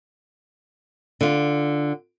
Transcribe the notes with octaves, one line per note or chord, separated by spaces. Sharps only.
D3 F4